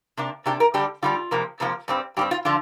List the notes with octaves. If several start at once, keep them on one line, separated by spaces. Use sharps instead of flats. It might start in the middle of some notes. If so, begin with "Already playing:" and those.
C3 A#3 D4
C3 A#3 D4 G4
A#4
D3 G3 D4 G4
D3 G3 D4 F4
F2 C3 F3 A#3
F2 C3 F3 A#3
G2 G3 C4
G2 G3 C4 G4
F4
D3 F3 D4 F4